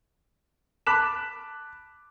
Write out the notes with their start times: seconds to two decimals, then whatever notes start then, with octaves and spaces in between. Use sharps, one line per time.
0.87 A5 B5 D6 F#6 B6 E7